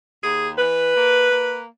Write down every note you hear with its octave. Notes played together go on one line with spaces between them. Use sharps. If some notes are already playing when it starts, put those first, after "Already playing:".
D#2 G#4
E3 B4
A#3
A#3